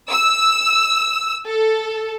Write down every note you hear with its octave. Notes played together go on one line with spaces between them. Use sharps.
E6
A4